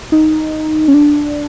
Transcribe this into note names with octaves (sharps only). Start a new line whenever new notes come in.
D#4
C#4
D4